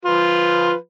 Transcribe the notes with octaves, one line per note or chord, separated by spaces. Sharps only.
F3 F4 B4